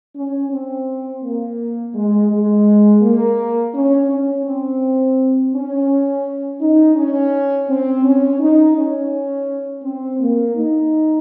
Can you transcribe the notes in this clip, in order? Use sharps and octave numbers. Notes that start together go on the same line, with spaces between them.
C#4
C4
A#3
G#3
G#3
A#3
C#4
C#4
C4
C#4
D#4
C#4
C4
C#4
D#4
C#4
C4
A#3
D#4